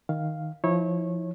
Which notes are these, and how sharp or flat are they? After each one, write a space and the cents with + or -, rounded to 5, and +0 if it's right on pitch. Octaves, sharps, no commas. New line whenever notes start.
D#3 +0 F5 +0
F3 -15 E4 -35 C#5 -20